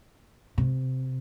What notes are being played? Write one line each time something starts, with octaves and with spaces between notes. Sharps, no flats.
C3